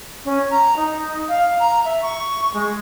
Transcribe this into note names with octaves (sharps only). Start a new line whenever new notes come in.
C#4
A#5
D#4
F5
A#5
E5
C#6
G#3